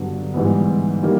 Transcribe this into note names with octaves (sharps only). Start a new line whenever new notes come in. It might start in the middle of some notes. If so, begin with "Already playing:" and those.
Already playing: G2 D3 F#3 B3
G#2 E3 G3 B3
D#3 G3 A#3